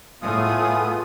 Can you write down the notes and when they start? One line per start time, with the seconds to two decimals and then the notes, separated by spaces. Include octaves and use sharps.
0.22 A2 A3 B3 F4 G#4 D#6